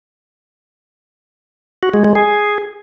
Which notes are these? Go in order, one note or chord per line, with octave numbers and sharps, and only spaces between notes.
F#4
G#3
G#3
G#4